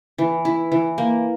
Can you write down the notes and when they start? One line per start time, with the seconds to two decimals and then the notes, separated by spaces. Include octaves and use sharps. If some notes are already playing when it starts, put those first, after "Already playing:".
0.18 E3
0.45 E4
0.72 E3
0.98 A#3